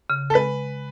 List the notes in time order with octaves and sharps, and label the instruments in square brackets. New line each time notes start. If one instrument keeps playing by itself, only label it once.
[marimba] C#3
[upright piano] A4
[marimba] G#3 [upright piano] B4